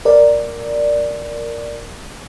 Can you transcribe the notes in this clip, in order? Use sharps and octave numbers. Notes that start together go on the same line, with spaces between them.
A#4 D5